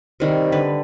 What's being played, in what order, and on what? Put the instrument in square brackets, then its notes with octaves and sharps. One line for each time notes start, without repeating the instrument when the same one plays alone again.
[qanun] C3 D#3 G3
D3 B4